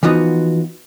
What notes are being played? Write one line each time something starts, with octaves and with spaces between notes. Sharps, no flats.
E3 F3 B3 D#4 F#4